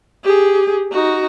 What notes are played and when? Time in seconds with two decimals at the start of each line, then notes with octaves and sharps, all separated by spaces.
0.23 G4 G#4
0.91 D#4 F#4